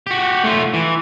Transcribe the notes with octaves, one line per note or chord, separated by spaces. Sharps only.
F#4 G4
A3 F4
E3